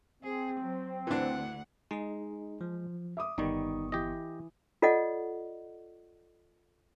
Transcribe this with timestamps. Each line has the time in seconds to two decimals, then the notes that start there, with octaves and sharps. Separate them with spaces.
0.23 C4 G#4
0.60 F#3
1.07 D2 E3 D4 F#5
1.91 G#3 D#4 G#4
2.61 F3
3.17 E5 D6 D#6
3.38 G1 D#3 G3 B3 D#4 C#6
3.92 E3 G4 D#5
4.82 F4 A4 D5 D#5 F#5